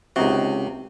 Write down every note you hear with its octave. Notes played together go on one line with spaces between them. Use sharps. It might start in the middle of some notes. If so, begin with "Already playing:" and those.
C#2 C3 D#4 F#4